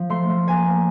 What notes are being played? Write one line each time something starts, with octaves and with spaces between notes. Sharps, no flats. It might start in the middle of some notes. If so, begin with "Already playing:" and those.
Already playing: F3
A3 C6
A3
A#3 G#5
A#3